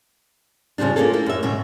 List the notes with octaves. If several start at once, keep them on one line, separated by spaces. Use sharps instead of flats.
F2 C#3 F3 G3 D4
A#3 C#4 F4 G#4 A4
A#3 E4 G4
F#2 E5
D2 G#2 B2 C#4